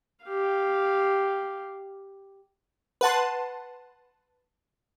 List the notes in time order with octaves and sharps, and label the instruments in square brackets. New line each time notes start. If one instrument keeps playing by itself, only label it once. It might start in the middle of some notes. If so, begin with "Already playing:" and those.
[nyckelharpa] G4 F5
[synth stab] B4 F#5 A5 C6